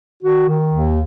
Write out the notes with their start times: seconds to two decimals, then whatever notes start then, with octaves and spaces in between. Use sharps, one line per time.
0.23 D#3 F#4
0.49 D#3
0.73 D#2